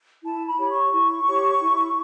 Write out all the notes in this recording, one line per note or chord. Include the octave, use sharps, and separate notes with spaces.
E4 A5
B5
G4 C#5
C#6
E4
G4 C#5
E4